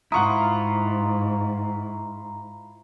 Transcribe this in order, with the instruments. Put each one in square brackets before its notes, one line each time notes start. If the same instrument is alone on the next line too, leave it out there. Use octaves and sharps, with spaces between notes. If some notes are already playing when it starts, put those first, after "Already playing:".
[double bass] G#2 [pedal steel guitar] E4 F4 [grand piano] F#5 C#6 D#6 [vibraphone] A#5